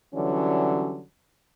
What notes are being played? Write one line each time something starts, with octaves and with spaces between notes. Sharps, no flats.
D3 E3 F#3 G3 C#4